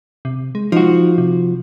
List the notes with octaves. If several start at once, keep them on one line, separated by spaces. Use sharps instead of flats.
C3
G#3
F3 D#4 F#4
C3